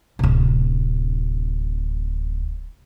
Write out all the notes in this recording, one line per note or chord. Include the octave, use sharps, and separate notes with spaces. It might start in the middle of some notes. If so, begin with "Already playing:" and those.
D1 C3